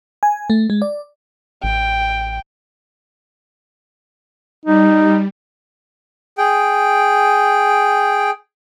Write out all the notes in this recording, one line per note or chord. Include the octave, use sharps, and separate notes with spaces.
G#5
A3
G#3
D5
A1 G5
G3 D#4
G#4 G5